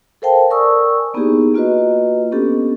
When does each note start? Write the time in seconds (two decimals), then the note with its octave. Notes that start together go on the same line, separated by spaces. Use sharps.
0.22 A4 A#4 C5 F5 G5 A5
0.50 A#4 D5 G#5 C#6 D#6 E6
1.14 A#3 B3 D#4 E4 G4 G#4
1.54 A#3 F4 F#4 B4 D#5
2.32 B3 C#4 D4 G4 A4